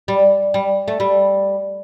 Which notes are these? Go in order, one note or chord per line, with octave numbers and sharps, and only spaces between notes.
G3
G3
A3
G3